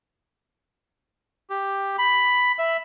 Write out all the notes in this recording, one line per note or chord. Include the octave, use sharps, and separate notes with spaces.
G4
B5
E5